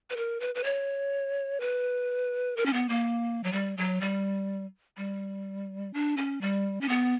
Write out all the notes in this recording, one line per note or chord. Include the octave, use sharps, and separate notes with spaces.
B4
A#4
B4
B4
C#5
B4
A#4
C#4
B3
A#3
F#3
G3
F#3
G3
G3
D4
C#4
G3
C#4
B3